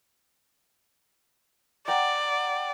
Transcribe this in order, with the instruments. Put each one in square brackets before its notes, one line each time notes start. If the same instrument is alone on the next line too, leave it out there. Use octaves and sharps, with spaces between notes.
[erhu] D5 [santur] F#5 G5 A#5